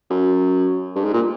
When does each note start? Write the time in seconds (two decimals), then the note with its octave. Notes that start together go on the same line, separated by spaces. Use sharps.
0.10 F#2
0.96 G2
1.04 G#2
1.14 A#2